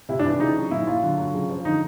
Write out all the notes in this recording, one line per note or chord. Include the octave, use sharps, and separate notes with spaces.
C3 E4
D4
E3
D4
C#3 D#4
F#3
A#2 E4
F#3 F4
D3
F#3
C#3
F3
D3 D#4